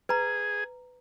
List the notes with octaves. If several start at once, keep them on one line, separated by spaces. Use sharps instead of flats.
G#4 B4 A#5